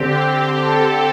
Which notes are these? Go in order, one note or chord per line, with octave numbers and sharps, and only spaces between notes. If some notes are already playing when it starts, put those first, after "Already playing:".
Already playing: D3 C4 G4
G4
A4